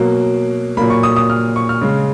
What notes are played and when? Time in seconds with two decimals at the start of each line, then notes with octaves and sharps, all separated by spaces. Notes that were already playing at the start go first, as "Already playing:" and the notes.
Already playing: B2 F#3 A#3
0.77 A#2 F#3 A#3 B5
0.90 C#6
1.03 D#6
1.16 D#6
1.30 F6
1.56 C#6
1.69 F6
1.81 C#3 G#3